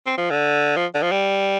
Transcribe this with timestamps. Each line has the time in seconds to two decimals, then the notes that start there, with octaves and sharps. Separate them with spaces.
0.06 C4
0.18 F3
0.30 D3
0.77 F3
0.94 D3
1.02 F3
1.11 G3